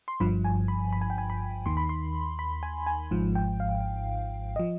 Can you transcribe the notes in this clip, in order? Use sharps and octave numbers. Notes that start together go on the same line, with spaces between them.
C6
G1 G2 F3 B5
G#5
B5
B5
G#5
G5
G#5
B5
D#2 D#3 C6
B5
C6
B5
G#5
G#5
G#1 G#2 F3
G5
F5
F3 D#5